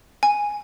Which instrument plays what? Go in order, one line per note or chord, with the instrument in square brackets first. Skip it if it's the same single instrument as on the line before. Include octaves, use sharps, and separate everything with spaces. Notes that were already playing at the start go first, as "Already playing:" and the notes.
[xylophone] G#5